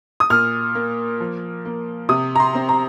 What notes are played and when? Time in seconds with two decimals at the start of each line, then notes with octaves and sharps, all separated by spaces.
0.20 D#6
0.30 A#2 F6
0.75 A#3
1.20 F3
1.65 A#3
2.09 C3 D#6
2.35 A#5
2.40 C6
2.55 C4
2.69 A#5